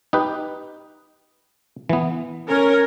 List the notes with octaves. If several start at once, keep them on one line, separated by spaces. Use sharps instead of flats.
D#4 G4 B4
E3 B3
C#4 A#4